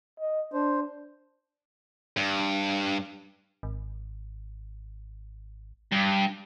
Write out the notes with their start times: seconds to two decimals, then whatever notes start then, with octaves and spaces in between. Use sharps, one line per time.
0.20 D#5
0.53 D4 C5
2.17 G2
3.63 G#1
5.92 G2